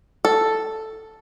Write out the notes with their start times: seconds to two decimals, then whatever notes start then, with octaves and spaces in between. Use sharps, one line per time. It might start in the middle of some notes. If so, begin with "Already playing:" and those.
0.25 A4